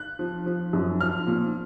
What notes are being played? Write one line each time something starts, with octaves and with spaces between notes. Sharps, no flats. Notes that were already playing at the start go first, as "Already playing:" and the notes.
Already playing: F#6
F3
F3
F#2
F3 F6
A#2